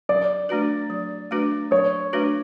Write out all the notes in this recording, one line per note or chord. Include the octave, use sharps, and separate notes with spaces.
F#3 D5
A3 D4 F#4 B4
F#3
A3 D4 F#4 B4
F#3 C#5
A3 D4 F#4 B4